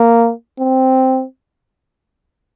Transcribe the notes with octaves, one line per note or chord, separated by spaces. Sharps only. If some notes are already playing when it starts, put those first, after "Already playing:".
Already playing: A#3
C4